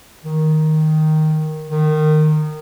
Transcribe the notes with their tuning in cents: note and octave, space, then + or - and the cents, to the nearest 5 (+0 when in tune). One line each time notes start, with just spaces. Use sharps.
D#3 +0
D#3 -20